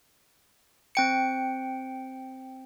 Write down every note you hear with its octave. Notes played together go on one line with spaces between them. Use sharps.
C4 G5 C#7